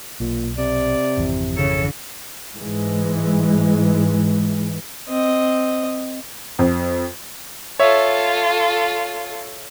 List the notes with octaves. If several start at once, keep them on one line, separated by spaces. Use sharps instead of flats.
B1 A#2
C3 D5
G#1 F2 E3
C#3 A4
G#2 E3 G#3
C4 D#5
F2
F4 A4 C#5 E5